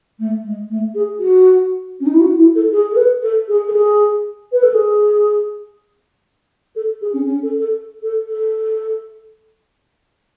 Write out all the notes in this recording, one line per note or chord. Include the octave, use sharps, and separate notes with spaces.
A3
G#3
A3
G#4
F#4
C#4
D#4
E4
F#4
E4
A4
G#4
A4
B4
A4
G#4
A4
G#4
B4
A4
G#4
A4
G#4
C#4
C#4
A4
A4
A4
A4